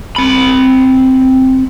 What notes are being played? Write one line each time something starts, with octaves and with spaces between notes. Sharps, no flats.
C4 B5